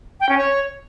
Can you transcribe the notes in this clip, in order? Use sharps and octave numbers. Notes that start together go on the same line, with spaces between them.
G5
C#4
C#5